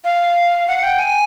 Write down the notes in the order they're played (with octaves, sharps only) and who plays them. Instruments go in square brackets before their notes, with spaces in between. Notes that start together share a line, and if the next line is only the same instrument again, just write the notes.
[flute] F5
F#5
G5
G#5